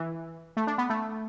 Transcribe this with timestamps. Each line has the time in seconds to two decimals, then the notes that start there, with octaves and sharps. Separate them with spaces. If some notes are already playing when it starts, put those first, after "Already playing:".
Already playing: E3
0.57 A3
0.67 D4
0.78 B3
0.90 A3